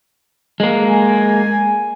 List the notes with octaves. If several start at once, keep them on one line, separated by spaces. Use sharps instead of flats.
G#3 A#3
G#5